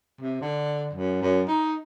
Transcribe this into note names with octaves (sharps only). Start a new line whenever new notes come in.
C3
D3
F#2
F#2
D#4